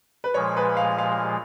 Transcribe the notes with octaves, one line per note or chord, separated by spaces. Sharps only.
B4
A#2 F3 G#3 C#5
B4
F5
F5